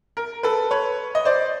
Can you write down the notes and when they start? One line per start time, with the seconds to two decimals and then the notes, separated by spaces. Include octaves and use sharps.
0.17 A#4
0.43 A4 B4
0.71 B4 C#5
1.15 D#5
1.25 C5 D5